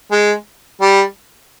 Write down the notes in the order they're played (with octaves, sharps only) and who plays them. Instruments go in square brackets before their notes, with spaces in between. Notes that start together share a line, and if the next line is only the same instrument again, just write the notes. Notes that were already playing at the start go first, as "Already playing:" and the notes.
[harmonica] G#3
G3